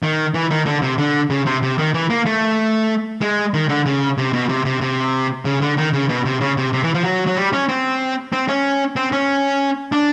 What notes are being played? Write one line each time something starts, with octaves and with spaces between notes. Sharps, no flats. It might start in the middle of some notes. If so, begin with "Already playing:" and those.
D#3
E3
D#3
D3
C3
D3
C#3
C3
C3
D#3
E3
A#3
A3
G#3
D#3
D3
C#3
C3
B2
C3
C3
C3
C#3
D3
D#3
C#3
B2
C3
C#3
C3
C3
E3
F3
F#3
F#3
G3
C#4
C4
C4
C#4
C4
C#4
D4